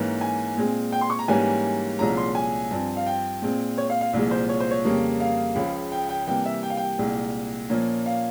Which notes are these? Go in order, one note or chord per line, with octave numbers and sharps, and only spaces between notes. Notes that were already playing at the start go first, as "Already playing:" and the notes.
Already playing: G#2 E3 A#3 C#4
G#5
A#2 G#3 C4
G5
C6
C#6
A#5
G#2 E3 G3 A#3 C#4 G#5
C2 A#2 F3 G#3 C#4 A#5
C6
G#5
G2 F3 C4
F5
G5
A#2 G#3 C4
C#5
F5
F5
C2 A#2 F3 G#3
C5
C#5
C5
C#5
F2 C#3 G3 A#3
F5
C#2 C#3 F3
G5
G5
C3 E3 G3 A#3 G5
E5
G5
F5
G5
C2 A#2 G#3
A#2 F3 A#3 C#4
F5